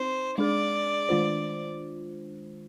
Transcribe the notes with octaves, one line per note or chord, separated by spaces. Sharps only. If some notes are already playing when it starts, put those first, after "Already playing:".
Already playing: C4 D#4 C5
G#3 D4 G#4 D5
D#3 G#3 D4 F4 C5